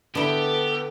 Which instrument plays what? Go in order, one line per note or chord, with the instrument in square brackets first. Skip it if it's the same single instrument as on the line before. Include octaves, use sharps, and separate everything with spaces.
[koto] D3 E4 [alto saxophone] B3 [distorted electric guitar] G4 [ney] A4